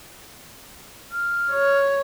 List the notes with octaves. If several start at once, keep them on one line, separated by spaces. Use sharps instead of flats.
F6
C#5